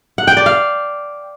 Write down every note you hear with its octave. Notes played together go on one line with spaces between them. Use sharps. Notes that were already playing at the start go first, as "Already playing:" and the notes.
F#5
G5
D5
F5